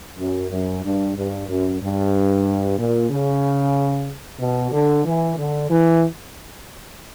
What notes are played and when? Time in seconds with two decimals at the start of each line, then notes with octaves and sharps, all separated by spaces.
0.18 F#2
0.51 F#2
0.84 G2
1.17 G2
1.48 F#2
1.81 G2
2.78 A#2
3.10 C#3
4.40 B2
4.72 D3
5.05 E3
5.37 D3
5.70 E3